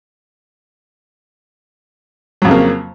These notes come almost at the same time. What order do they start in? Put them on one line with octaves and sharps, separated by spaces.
F#3 F2 C#3 A#3